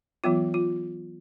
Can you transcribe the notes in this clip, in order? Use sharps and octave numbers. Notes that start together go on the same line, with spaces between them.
E3 F#3 B3 F4
F4